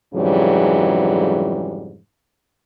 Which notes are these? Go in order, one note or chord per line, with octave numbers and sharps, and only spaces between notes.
F2 G#2 C#3 E3 F#3 G3